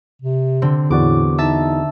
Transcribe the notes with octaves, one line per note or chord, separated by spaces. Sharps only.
C3
D3 C4
E2 A2 F#4 D5 D6
D#4 E5 A5